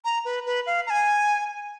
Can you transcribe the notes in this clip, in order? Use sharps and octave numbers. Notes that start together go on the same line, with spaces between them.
A#5
B4
B4
F5
A#5
G#5